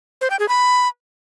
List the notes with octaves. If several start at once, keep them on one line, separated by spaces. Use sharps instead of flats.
C5
G5
G#4
B5